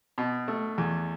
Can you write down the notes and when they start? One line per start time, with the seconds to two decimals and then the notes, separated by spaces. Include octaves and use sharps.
0.18 B2
0.48 A3
0.78 E2